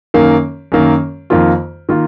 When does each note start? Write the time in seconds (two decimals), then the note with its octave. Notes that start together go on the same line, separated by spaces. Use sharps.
0.14 F#2 D#3 A#3
0.72 F#2 D#3 A#3
1.30 F2 D#3 A#3 F4
1.89 D#3 A#3 F4